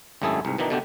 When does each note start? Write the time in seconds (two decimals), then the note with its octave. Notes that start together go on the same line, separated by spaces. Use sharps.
0.22 G#1 F#2 A3 E4 G#4 A4
0.45 C2 G#2
0.58 B2 D#3 E3 D4 D#4
0.70 B2 D3 A3 B3 D4 G4